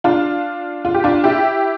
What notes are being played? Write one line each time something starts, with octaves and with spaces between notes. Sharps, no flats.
D4 F4
F4
G4
D4 F4
E4 G4